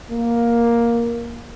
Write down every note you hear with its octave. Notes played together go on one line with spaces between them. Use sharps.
A#3